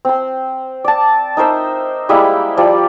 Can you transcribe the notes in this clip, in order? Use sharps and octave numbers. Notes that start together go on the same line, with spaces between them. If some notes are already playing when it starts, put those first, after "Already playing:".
C4 C6
D5 A5
D#4 A#4 C5 E5
G3 G#3 A#3 E4
F3 G3 D5